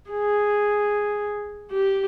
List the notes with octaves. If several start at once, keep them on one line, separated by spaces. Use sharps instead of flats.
G#4
G4